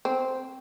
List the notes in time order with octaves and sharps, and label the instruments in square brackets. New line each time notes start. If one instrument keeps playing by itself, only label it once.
[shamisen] C4